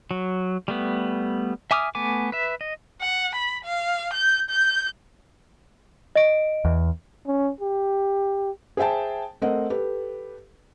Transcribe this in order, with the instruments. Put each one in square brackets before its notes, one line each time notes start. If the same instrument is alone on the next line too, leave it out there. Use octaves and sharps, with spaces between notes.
[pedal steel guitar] F#3
G3 A3 B3
E5 G#5 D6 D#6 F6
A3 B3 G#5 D6
B4 E5
D#5
[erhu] F#5
B5
F5
G6
G6
[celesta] D#5 D7
[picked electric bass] E2
[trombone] C#4
G4
[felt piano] G#4 C5 E5 G5 A5
A3 C4 A#4 C5 D#5 F#5
G4 A4 B4